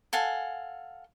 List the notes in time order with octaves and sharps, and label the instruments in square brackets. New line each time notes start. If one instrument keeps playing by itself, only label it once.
[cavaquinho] A4 F5 F#5 G#5